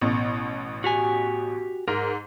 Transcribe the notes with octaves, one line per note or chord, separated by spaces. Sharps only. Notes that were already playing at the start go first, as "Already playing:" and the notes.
A1 B2
F#4 G4 G#5
G#2 A#4